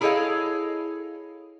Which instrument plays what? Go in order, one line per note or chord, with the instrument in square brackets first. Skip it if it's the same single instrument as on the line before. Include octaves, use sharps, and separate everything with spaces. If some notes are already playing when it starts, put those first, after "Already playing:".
[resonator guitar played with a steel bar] E4 G#4 A4 C#5 D#5 F5